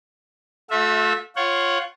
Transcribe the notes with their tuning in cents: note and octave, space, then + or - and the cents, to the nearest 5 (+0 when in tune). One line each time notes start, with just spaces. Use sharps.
A3 -20 F4 +45 E5 -10
F4 +0 C#5 -10 F#5 +20